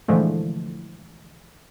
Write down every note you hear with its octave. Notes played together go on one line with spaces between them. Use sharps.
A#2 D3 E3 F3 G#3 A3